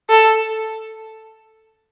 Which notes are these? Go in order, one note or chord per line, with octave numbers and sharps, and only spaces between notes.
A4